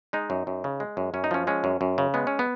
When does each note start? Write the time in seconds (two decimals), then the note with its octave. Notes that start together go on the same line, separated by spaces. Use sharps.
0.13 G#3 D#4
0.30 F#2
0.47 F#2
0.64 C#3
0.80 G#3
0.97 F#2
1.14 F#2 C#4
1.24 D#4
1.31 F3 C#4
1.47 G#3 C#4
1.64 F#2
1.81 F#2
1.98 C#3
2.14 G#3 B3
2.27 C#4
2.39 B3